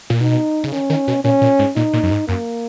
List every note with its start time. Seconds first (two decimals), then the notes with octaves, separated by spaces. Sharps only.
0.10 A#2
0.21 B2 D#4
0.64 C#3
0.72 D#3 C#4
0.90 D#3
1.08 B2
1.24 A#2 C#4
1.41 A#2
1.59 G#2
1.76 A#2 D#4
1.93 A#2
2.03 F#2
2.11 G#2
2.28 F#2 A#3